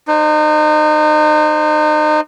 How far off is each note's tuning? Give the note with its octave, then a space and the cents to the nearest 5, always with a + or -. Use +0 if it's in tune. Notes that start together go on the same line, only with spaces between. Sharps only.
D#4 -35 C5 +0